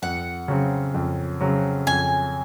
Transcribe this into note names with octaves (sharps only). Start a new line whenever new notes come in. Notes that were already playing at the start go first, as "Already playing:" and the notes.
F2 F#5
C#3 F#3 C4
F2
C#3 F#3 C4
F2 G#5